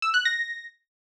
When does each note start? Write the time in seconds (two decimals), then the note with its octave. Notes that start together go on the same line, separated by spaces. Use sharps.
0.02 E6
0.14 F#6
0.25 A#6